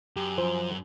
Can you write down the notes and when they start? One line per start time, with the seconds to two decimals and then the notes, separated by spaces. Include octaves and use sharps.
0.16 F#2 G4
0.38 F3 C5 G#5